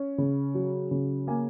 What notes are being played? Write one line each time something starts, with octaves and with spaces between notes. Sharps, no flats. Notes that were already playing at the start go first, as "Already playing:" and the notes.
Already playing: C#4
C#3
F#3
C#3
A#3 G#5